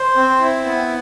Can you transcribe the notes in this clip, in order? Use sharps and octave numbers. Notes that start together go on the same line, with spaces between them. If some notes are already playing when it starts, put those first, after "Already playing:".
Already playing: C5
C4
E4
B3